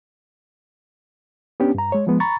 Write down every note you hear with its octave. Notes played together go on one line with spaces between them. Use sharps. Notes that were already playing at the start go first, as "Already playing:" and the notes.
B3 C#4 D4 G4
G2 A#5
G#3 C#5
F3 G#3 B3
A#5 B5 C#6 A6